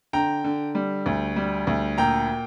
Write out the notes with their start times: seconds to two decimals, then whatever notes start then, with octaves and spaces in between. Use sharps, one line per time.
0.13 D3 G5 A#5
0.44 D3
0.75 G3
1.06 D2
1.36 G3
1.67 D2
1.98 A#2 G5 A#5